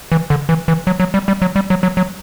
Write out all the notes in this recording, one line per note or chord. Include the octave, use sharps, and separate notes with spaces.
E3
D3
E3
E3
F#3
F#3
G3
G3
F#3
G3
F#3
F#3
F#3